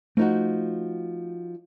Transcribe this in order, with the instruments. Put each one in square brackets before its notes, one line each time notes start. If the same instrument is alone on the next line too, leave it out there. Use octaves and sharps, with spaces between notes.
[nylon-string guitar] F3 D#4 F#4 [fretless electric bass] A3